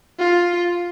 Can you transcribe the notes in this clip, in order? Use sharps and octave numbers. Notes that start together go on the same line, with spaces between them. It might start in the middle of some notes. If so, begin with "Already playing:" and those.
F4